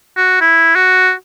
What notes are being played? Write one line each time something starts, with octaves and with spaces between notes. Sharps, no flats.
F#4
E4
F#4